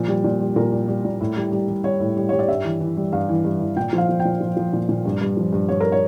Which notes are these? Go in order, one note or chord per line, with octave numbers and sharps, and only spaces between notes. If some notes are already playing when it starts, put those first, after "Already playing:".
Already playing: A#2 F3
G3
A#2
G3
A#2 A#4
G3
G3
A#2
A2
G3
G3
G3
G3 C#5
A2
G3
G3 C#5
D5
G2 E5
E3
E3
G3
G2 F5
E3
G2
E3
A#2 G5
F3
F5
F3
G5
A#2
F3
F3
A#2
A#2
G2
G2
F3
G2
G2 C#5
A#4
C#5